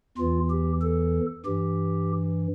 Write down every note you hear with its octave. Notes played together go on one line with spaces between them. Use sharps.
E2 E3 F4
G4
A4
G2 E3 G4